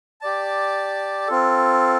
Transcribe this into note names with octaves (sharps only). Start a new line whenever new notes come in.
G4 D5 A5
C4 F4 A4